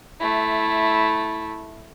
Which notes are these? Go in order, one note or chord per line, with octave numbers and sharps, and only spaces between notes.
A3 E4